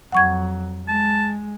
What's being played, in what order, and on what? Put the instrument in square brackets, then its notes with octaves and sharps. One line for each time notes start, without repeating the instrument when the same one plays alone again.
[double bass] F2 F#3 [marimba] F#5 C#6 G#6
[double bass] G#3 [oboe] A5